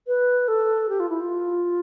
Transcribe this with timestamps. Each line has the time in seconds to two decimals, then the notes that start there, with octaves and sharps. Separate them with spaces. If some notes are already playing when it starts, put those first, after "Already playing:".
0.07 B4
0.48 A4
0.89 G4
1.00 F4
1.09 E4
1.20 F4